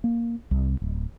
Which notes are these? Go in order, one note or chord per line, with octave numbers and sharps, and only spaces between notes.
A#3
C2
D1